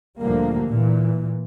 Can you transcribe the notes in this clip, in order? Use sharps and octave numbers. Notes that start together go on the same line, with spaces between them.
D2 A#2 D3 F3 G3 A#3
A#2 E3